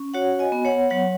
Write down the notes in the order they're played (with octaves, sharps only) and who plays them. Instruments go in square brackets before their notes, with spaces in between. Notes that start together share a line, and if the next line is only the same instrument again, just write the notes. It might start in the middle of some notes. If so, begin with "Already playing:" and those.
Already playing: [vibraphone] C#4
F#4 C#5 F#5
D#5 G#5
B3
C#5 F#5
F#3 C#5 F#5